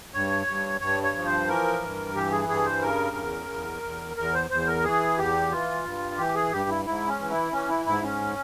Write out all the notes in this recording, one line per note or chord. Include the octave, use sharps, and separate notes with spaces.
G2 C#5
G2
G2 C#5
C#5
F3
C5
E3 A#4
G2
E3 G4
G#4
G2 G#4
C5
C#3 A#4
E2
E2
E2
E2 A#4
C5
E2 C5
A#4
E3 G#4
E2 G4
E3 F4
G2
E3 G4
G#4
G2 G4
E4
G#2 E4
C#4
E3
E4
E3 C#4
E4
G#2 E4
C#4